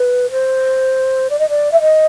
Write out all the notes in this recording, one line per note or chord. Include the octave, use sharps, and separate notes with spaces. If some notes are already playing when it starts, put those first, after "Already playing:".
Already playing: B4
C5
D5
D#5
D5
E5
D#5